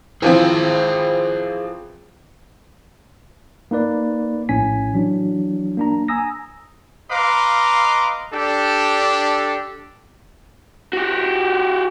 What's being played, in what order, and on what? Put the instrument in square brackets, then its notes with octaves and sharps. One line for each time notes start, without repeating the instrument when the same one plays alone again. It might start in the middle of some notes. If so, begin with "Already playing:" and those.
[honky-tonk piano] E3 F3 C4 [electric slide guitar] G#4 C5 G5
[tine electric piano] A#3 D#4 B4 D5
A#1 A2 C#4 G#5 B6
E3 F#3 D4
A#3 D4 A#5
G#5 A#5 D#6 E6 A#6
[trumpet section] B4 D#5 F5 A#5 C6 D6
D4 G4 A4
[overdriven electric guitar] F#4 G4